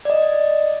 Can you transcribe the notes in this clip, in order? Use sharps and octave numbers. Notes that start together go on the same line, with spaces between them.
D5 D#5